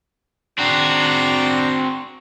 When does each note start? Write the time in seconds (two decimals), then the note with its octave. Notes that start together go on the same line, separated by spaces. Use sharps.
0.59 C4 D4 F#4 G5 A#5